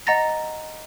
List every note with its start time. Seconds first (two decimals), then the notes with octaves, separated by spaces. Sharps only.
0.07 D#5 F#5 A#5 A6 A#6